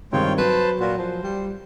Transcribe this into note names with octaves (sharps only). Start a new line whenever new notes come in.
G2 D#3 G#3 C4 F4 C#5 G5
F#3 B4 C5 A5
A#2 F4 F#4
F3 C5
G3